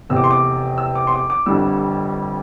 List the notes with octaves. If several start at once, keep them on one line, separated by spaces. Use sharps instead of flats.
F1 E2 C3 E6
D6
C6
D6
E6
D6
C6
D6
D6
G1 F2 D3 G3 E6